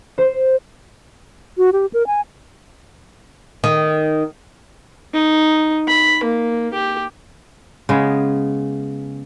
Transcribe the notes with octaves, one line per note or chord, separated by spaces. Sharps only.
C5
F#4
G4
A#4
G#5
D#3
D#4
B5
A#3
G4
C#3 G#3 B3